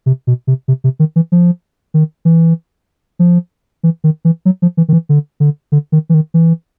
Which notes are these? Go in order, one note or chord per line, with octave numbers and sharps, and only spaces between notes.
C3
B2
C3
C3
C3
D#3
E3
F3
D#3
E3
F3
E3
D#3
E3
F#3
F3
E3
D#3
E3
D3
D3
D3
D#3
E3
D#3
E3